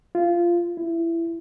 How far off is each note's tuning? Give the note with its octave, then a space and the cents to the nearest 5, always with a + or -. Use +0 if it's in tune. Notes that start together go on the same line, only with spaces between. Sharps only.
F4 -15
E4 +20